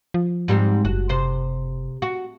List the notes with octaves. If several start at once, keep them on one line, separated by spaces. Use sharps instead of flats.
F3
G#2 G3 C4
F#1 F#4
C3 C5
F#4